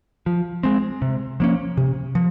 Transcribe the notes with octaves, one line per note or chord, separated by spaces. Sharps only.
F3
G#3 C4
C3
F3 A#3 C#4
C3
F3